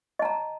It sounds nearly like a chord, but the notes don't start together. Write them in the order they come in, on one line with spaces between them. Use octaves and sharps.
D#5 A5 A#5